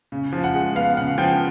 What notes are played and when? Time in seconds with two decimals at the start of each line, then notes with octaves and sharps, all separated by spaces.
0.12 C#3
0.33 F3
0.44 F#5
0.54 G#3
0.75 B3 F5
0.97 C#3 F#5
1.18 F3 G5